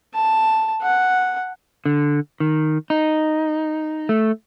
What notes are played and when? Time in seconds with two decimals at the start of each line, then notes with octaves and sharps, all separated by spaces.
0.14 A5
0.82 F#5
1.86 D3
2.40 D#3
2.90 D#4
4.09 A3